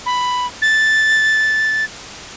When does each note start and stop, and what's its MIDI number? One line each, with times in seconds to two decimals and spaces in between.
0.06 0.47 83
0.62 1.85 93